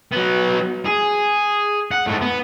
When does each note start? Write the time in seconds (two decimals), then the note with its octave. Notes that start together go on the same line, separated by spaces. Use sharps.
0.12 F#3 B3
0.85 G#4
1.91 F#5
2.07 G#2 A3
2.21 B3